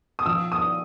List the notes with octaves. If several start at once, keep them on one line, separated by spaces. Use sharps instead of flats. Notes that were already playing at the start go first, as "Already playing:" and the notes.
D#6
F3 E6
D#6